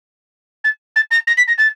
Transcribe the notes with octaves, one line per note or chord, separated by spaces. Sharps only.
A6
A6
A#6
A#6
B6
A#6
A6